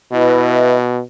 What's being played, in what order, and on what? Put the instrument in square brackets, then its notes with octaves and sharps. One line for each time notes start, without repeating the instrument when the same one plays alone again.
[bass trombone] B2 [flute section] E4 B4 D#5